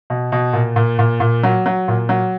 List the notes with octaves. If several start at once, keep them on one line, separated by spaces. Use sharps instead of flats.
B2
B2
A#2
A#2
A#2
A#2
F#3
F#3
A#2
F#3